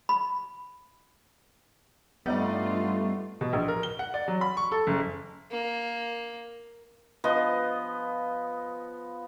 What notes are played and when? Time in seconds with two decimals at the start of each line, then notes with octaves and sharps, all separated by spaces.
0.09 B5
2.26 G2 G3 A3 B3 D#4 F4 D5
3.41 B2
3.53 A#1
3.68 A#4
3.83 G7
3.99 F#5
4.14 D5
4.28 F#3
4.41 B5
4.57 C#6
4.72 A4
4.87 F#1
5.51 A#3
7.24 F3 B3 D#5